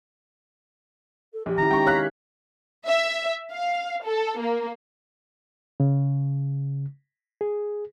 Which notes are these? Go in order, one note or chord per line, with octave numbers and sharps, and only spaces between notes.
A4
A#1 G4
D#3 C#4 E4 A#5
G#3 C#4 D#4 G5 C#6
C#5 F5 F6 F#6 B6
E5
F5
A4
A#3
C#3
G#4